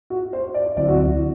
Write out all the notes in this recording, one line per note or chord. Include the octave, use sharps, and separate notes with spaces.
F#4
C5
D5
D2 D3 F#3 C4 E4 D5
F#4